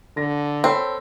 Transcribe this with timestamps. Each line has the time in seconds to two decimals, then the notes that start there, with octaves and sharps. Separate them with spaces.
0.17 D3 A#6
0.64 C4 A4 C#5 B5